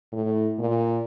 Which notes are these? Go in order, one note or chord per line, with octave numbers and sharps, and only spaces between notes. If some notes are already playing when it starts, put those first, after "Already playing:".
A2
A#2